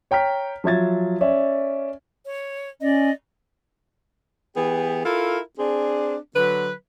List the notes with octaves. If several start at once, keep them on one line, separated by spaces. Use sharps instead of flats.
C#5 G5 A#5 F6 B6
F3 F#3 E5 G#6 A6
C#4 D5 E5
C#5
C#4 D5 D#5
E3 B3 G4 G#4
E4 F4 A4 A#4
C4 D4 G#4
D3 F#3 B4